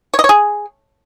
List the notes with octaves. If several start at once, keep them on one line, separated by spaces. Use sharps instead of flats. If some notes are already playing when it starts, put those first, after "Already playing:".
C#5
D#5
C#5
G#4